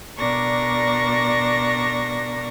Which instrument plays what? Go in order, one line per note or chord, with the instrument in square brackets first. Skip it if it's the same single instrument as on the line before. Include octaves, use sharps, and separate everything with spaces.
[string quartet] B2 D4 A#4 D5 C#6 A#6